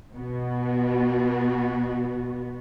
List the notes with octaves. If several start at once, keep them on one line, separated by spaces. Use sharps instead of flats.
B2 B3 F#4